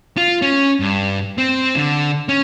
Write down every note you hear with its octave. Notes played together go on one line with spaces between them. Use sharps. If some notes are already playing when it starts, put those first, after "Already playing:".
F4
C#4
G2
C4
D3
C#4